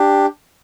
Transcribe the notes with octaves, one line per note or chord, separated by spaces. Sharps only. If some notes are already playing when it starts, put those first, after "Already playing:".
Already playing: D4 G4